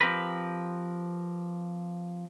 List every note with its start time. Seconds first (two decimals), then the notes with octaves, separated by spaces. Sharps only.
0.01 F3 C4 G4 A#4 B4